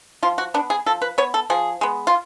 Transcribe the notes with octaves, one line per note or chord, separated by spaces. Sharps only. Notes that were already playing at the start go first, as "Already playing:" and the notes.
F3 F4
F#4
B3 D4
G#4
F3 A4
B4
B3 C#5
A4
F3 G#4
G#3 B3
F4